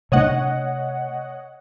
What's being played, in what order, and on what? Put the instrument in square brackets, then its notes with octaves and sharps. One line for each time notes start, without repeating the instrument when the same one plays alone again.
[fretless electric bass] C3 A3 D4 [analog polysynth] C#5 D#5 F#5